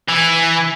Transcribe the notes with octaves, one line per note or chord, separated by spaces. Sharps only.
E3